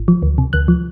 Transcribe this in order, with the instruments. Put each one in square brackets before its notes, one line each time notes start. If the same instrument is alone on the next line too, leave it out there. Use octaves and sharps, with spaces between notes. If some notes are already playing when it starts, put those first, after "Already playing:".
Already playing: [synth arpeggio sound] G#1
F3
D2
C3
D2 F#6
F3